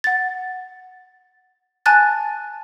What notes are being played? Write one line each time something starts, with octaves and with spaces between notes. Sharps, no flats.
F#5 A6
G#5 A5 F#6 A6